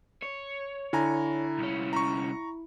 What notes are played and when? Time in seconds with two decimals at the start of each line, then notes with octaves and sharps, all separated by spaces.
0.22 C#5
0.93 D3 E4 G#5 A#5
1.58 C2 C#4
1.93 A#5 C#6